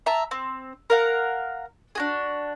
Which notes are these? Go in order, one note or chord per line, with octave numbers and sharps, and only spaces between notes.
E5 A5 A#5
C4
A#4 F5 F#5
D4 F#4 G#4